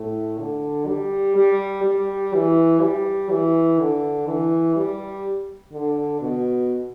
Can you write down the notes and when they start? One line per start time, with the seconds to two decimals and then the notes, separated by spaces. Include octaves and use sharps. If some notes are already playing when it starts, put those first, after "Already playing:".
Already playing: A2
0.39 D3
0.88 G3
1.36 G3
1.84 G3
2.34 E3
2.81 G3
3.30 E3
3.79 D3
4.28 E3
4.76 G3
5.73 D3
6.21 B2